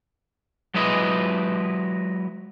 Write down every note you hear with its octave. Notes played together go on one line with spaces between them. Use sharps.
F#3 G#3 E4 B4 D#5